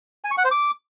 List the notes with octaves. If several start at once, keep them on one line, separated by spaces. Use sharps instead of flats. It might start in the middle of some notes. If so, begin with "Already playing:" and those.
G#5
C#6
F#5
C5
D6